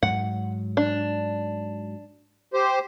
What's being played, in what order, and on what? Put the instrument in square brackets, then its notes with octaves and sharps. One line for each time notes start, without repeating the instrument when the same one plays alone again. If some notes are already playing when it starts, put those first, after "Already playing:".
[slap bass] G#2 F#3 [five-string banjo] F#5
[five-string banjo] D4
[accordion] G4 C5